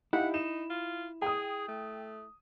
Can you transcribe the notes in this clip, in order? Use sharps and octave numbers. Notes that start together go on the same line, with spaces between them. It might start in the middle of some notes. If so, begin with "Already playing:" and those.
D#4 E4 G4 F5 F#5
D#4 E7
F4
G#4 G5 D#6
A3